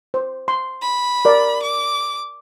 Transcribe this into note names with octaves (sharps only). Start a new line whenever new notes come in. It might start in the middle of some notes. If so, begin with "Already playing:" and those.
C5
C6
B5
A#4 D5
D6